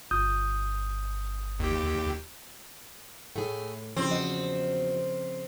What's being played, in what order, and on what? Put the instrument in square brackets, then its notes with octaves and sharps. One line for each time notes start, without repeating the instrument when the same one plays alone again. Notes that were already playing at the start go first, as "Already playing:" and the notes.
[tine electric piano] G1 D#6 G6
[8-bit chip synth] D#2 G4
[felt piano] A2 [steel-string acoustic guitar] A3 G#4
[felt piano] C#3 F3 [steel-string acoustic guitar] E3 G3 [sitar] C4
[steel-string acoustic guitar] E2 F#4 D#5